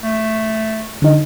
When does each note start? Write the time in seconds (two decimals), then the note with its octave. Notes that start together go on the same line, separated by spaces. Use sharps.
0.03 A3
1.02 D3 D#4